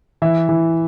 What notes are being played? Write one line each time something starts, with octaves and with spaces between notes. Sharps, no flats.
E3 E5
E3